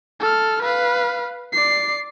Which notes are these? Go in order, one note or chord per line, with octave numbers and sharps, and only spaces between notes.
A4 F6
B4 F5
D5 C7